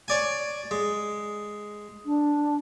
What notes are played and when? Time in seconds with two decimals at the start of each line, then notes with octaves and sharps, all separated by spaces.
0.08 C#5 D5 G#5
0.71 G#3
2.05 D4